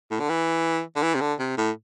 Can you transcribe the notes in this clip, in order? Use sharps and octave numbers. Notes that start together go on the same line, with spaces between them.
A2
D3
E3
D3
E3
C3
D3
C3
A2